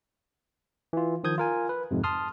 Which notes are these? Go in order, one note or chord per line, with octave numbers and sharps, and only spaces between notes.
E3 F4
D#3 F3 D#6 G6 G#6
F4 A#4 G#5
B4
F2 G#2 C3
A5 C6 D#6 F6